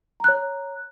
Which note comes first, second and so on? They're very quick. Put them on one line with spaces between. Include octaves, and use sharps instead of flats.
A#5 F#6 C#5